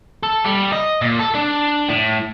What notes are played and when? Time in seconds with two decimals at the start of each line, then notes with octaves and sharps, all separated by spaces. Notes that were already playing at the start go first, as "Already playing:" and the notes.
0.23 A4
0.45 G3
0.72 D#5
1.01 A#2
1.19 A4
1.34 D4
1.89 A2